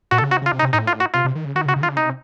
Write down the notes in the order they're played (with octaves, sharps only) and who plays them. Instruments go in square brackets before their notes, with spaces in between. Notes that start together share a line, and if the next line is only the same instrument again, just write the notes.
[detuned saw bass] A#2 [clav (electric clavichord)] F#4
[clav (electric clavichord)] A4
[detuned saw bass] C#3
[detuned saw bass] C3 [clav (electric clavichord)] F#4
[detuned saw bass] C#3
[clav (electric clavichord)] F4
[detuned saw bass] C3
[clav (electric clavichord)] D#4
[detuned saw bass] C3
[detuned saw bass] A2 [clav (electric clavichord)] D#4
[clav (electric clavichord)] F4
F#4
[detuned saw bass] C3 [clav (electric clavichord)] F4
[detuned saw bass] C3
D#3
C#3
[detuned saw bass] D#3 [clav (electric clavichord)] F#4
[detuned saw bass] C#3
[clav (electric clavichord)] F#4
[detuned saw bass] C#3
[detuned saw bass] D#3 [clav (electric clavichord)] F4
[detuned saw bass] C#3
[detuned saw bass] C3 [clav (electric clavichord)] D#4